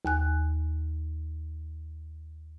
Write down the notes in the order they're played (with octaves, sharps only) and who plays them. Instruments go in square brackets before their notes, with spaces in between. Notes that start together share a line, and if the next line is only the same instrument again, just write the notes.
[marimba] D#2 G#5 F#6